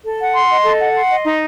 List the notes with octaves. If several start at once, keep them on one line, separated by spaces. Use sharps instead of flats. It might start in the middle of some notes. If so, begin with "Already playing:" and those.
A4
F#5
C6
D#5
A4
F#5
C6
D#5
D#4